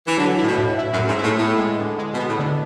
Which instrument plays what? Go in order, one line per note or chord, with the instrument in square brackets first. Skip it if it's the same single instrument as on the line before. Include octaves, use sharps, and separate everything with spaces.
[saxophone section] E3
[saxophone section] D3 [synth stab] F#3
[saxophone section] A2 [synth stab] E4
[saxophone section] B2
[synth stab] A2
E4
[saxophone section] F#2
[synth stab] A2
[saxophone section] G#2
[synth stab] E4
[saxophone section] A2
[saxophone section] A2 [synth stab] B3
[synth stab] G#3
D3
G#3
[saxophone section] B2
[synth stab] B3
[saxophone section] A2
[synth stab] D3